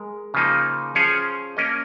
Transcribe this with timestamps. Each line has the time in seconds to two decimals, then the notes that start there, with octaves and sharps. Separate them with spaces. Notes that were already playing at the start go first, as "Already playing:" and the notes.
Already playing: G#3 A#4
0.34 C#3 F3 A#3 D#4
0.95 F3 C#4 G#4 C#5
1.57 A#3 C#4 A#4 D#5